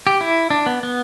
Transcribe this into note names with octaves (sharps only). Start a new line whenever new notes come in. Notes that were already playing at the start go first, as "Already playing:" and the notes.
G4
E4
D4
B3
B3